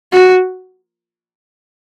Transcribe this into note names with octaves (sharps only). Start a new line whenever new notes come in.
F#4